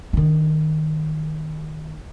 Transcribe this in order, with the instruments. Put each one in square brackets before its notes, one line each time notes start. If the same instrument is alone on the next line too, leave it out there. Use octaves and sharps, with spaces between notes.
[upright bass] D#3 D4